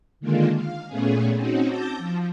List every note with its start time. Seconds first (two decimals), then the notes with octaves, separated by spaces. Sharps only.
0.20 D3 D#3 G#3 A#3 D4 F4
0.54 F5
0.86 A#2 A3 B3 C#4 G#4
1.35 C4 C#4 D#4 F#4
1.68 A5 D6 E6 G6 A6 A#6
1.98 F3